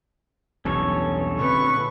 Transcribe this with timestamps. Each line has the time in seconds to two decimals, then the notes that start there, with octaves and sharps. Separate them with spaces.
0.65 B1 E2 G2 C#4 A4 C#5
1.40 A#2 D3 C4 B4 C#6